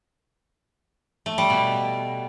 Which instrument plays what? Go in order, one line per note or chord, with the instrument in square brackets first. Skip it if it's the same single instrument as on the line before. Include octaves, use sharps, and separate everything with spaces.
[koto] A3
G3
B2